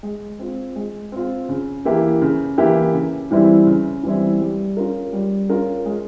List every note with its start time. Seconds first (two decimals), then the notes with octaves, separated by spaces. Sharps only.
0.03 G#3
0.39 C4 F4
0.76 G#3
1.12 C4 F4
1.49 C#3
1.85 E3 A#3 E4 G4
2.22 C#3
2.58 E3 A#3 E4 G4
2.94 C#3
3.31 E3 G3 C4 E4
3.67 C#3
4.03 E3 G3 C4 E4
4.41 G3
4.77 C#4 F4 A#4
5.13 G3
5.50 C#4 F4 A#4
5.86 G#3